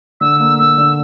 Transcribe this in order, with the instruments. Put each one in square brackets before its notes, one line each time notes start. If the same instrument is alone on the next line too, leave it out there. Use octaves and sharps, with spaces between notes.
[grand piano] D3 [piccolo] E6
[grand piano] A#3
[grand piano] A#3 [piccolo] E6
[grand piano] D3